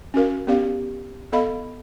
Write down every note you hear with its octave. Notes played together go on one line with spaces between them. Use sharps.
C#4 F#4 A#4 F5
B3 C#4 G4 D5 F5
B3 A4 D#5 F5 B5